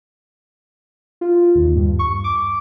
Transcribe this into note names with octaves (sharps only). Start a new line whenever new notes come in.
F4
D#2
G2
C#6
D6